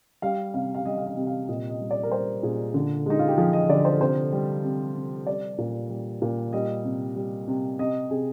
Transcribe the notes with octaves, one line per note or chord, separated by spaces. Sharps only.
G3 F5
C3 F5
F5
G3 D#5
F5
D#5
C3
F5
A#2 D#5
D#5
G3
D5
A#4
G3 C5
A#2 G#4
D3
G#3 D#4
F4
G4
F3 G#4
D#5
D3 D5
C5
C3 C5
G3
C3
C3
G3 D5
A#2
G3
A#2
G3 D#5
C3
G3
C3
C3 D#5
C3 G#4